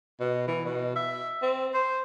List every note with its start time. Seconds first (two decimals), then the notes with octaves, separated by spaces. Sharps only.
0.20 B2
0.47 E3
0.66 B2
0.96 E5
1.42 C4
1.74 C5